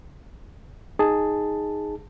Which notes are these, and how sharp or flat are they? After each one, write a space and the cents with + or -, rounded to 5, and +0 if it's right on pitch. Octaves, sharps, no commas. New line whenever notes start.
D#4 +0 G#4 +0 A5 +5